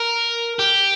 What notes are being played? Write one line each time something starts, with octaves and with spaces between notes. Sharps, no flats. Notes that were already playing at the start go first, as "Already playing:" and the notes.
Already playing: A#4
G4